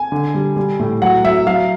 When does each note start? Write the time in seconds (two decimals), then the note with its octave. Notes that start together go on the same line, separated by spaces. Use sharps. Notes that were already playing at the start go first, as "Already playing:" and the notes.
Already playing: G#5
0.12 D3
0.34 G3
0.57 G3
0.79 A2
1.02 F#3 F#5
1.24 F#3 E5
1.47 F#3 F5